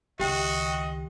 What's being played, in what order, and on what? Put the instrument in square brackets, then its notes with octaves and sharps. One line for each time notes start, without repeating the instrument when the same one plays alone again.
[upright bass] C#2 D#3 [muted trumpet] F#4 [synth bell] G4 G5 [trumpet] D#5